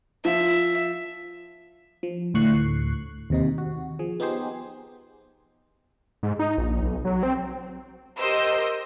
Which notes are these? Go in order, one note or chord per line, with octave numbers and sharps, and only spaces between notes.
F3 F4 E5
F3
D2 A2 C#6 F#6 C7
D#2 C3 D#4
F#4
F3 G#4
B3 D#4 G4 G#4 C5
G#2
D#4
A#1
B1
F#3
C4
G4 A#4 C5 D#5 E6